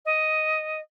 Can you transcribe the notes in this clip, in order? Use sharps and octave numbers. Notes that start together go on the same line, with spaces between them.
D#5